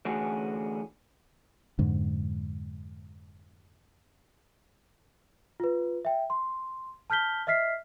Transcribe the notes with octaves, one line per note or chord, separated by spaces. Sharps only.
D3 E3 A3 C#4 F#4 G#4
F2 G#2 D3
F4 B4
E5 G5
C6
A5 F6 G6 B6 G7
D#5 E5 F6 B6 C7